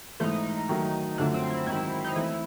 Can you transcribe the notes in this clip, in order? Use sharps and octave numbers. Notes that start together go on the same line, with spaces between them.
G#2 E3 A3 D#4
D#3 F#3 A3
F#2 D3 F3 A3 D4
C4
E4
G#2 D#3 F#3 E4
D#4
E3 A3 C4 E4